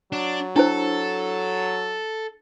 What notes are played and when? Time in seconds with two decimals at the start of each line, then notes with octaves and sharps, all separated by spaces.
0.12 F#3 D4
0.56 D4 E4 A4 C5